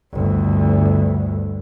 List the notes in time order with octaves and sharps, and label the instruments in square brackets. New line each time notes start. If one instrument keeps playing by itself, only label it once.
[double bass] G1 D2